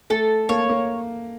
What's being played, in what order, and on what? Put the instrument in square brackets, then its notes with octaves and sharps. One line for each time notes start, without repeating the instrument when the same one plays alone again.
[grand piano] A3 [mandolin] A4
[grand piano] A#3 [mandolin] C#5
[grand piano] A#3